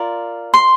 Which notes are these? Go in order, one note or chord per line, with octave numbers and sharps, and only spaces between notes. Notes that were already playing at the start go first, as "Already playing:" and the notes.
Already playing: F4 A#4 D5
C6